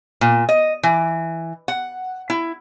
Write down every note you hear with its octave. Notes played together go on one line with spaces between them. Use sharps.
A#2
D#5
E3
F#5
E4